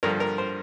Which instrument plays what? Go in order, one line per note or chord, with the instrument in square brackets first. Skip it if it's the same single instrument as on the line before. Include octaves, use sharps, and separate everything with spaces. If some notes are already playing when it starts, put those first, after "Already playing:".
[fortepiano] G2 D3 F3 A#4
A#4
C5